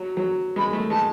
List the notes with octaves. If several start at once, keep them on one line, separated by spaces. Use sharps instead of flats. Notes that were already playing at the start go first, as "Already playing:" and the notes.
Already playing: F#3
F#3
G#3 B5
A3
G#3 A5